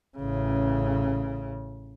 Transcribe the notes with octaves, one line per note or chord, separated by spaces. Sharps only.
A1 C#3